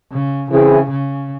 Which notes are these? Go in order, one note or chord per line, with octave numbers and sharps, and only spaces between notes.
C#3
C#3 E3 C4 E4 G#4
C#3